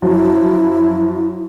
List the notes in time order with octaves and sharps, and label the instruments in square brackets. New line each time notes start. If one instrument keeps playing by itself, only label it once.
[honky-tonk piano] F#2 F3 F#3 [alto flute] E4